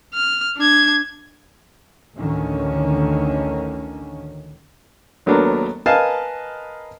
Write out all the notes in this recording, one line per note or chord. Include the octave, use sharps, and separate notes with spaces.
F6
D4 G#6
A1 D2 D3 D#3 C#4
D#2 F#3 A3 B3 D4 A#4
A#4 B4 D#5 F5 G#5 A5